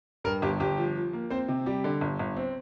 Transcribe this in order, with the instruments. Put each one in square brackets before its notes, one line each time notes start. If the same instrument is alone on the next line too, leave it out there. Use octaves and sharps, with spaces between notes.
[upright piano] G2 [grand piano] A#4
[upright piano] G1 [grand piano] G4
[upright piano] G1 [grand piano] G4
[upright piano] F3
F3
A#3
[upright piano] C4 [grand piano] C5
[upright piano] C3
[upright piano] G3 [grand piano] G4
[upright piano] D3
G1
G1
[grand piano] C4